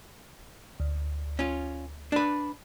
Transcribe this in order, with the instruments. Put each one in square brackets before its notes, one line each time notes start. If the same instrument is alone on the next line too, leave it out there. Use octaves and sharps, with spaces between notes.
[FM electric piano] D2
[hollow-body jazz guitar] C#4 F4
D4 B4